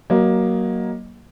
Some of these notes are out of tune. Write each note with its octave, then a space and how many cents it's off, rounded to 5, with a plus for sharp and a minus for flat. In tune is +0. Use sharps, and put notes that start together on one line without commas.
F#3 +20 A#3 +15 D#5 -5